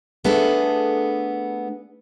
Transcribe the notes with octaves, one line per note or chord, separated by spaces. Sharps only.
A3 B3 D4 G#4 A4